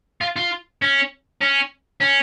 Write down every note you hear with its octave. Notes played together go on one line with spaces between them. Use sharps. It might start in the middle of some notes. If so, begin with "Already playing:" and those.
F4
F4
C#4
C#4
C#4